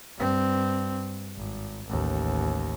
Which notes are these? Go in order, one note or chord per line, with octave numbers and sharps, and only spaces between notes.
G2 C4
G#1
A1 D#2